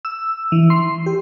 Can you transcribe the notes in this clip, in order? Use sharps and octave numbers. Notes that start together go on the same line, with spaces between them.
E6
E3
C6
G4